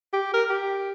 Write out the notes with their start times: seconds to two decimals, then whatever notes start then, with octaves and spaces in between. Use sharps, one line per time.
0.13 G4
0.34 A#4
0.50 G4